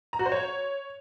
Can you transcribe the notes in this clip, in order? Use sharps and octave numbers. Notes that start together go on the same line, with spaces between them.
A#5
F#4
C5
C#5